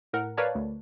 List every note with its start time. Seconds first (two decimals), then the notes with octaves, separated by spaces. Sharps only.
0.13 A2 A#4 F#5
0.37 A#4 B4 C#5 D5 F5 A5
0.55 D2